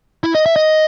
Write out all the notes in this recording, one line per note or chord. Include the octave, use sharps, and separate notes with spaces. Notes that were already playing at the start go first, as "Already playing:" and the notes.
E4
D#5
E5
D#5